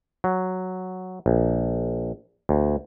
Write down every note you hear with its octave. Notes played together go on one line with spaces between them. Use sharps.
F#3
A#1
D2